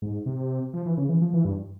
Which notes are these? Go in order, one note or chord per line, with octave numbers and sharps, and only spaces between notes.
G#2
C3
F3
E3
C#3
E3
F3
E3
G2